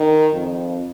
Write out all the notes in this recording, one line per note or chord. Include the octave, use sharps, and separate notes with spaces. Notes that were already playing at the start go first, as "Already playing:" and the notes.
Already playing: D#3
F2